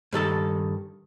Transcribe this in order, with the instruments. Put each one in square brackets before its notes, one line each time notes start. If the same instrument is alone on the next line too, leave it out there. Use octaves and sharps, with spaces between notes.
[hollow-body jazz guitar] G2 D#3 A4 A5